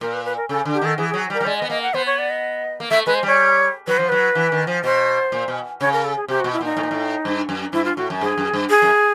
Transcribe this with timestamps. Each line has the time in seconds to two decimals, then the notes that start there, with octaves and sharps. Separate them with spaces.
0.01 A#2 A#4
0.13 B4
0.25 B4
0.37 A#4
0.49 C#3 A4
0.65 D3
0.74 G4
0.82 D#3 A4
0.98 E3 G#4
1.10 G#4
1.14 F#3
1.30 G3
1.34 A#4
1.41 G3
1.45 G#3 D5
1.58 D#5
1.62 B3
1.70 A#3 D#5
1.82 F#5
1.94 B3 C5
2.06 C#5
2.18 D5
2.30 D#5
2.80 A#3
2.91 A3 E5
3.06 G#3 B4
3.15 C5
3.23 G3 C#5
3.87 F#3 B4
3.98 F3 C5
4.09 F#3 B4
4.35 E3
4.52 D#3
4.67 F3
4.84 B2 C5
5.32 A#2
5.48 B2
5.81 C#3 C#5
5.93 A#4
6.04 A4
6.16 G#4
6.28 C3 G4
6.40 F#4
6.44 B2
6.53 E4
6.61 A#2 D#4
6.77 A2
6.83 A#2
6.91 A2
7.25 G2
7.49 F#2
7.73 G2 E4
7.85 F4
7.97 A2 F#4
8.10 F#2
8.21 G2 G#4
8.38 F#2
8.54 G2
8.70 G#4
8.82 F#2